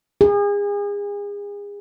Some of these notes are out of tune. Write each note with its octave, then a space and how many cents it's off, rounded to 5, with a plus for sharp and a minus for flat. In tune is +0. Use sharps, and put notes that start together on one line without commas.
G#4 -35